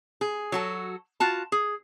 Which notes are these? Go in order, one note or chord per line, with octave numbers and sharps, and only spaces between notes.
G#4
F#3 F#4 A4
F4 F#4 A5
G#4